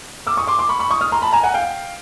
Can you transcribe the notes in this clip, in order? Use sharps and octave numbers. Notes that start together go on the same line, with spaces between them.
D6 E6
C#6 D#6
C6 D6
C6 D6
B5 C#6
B5 C#6
C#6 D#6
D#6 F6
A#5 C6
A5 B5
G#5 A#5
F#5 G#5
F5 G5